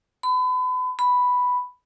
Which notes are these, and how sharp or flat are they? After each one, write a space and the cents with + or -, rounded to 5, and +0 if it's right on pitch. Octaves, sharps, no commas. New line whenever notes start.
B5 +35
B5 +0